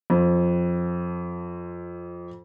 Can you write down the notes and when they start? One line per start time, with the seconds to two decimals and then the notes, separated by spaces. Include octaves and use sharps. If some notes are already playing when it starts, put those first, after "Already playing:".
0.10 F2 F3